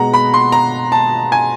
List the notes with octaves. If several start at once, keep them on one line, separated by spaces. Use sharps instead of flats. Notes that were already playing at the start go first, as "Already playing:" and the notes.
Already playing: B2 G#3 F#5 A#5
B5
C6
A#5
A5
G#5